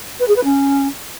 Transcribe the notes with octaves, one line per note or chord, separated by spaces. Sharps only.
B4
G#4
B4
C#4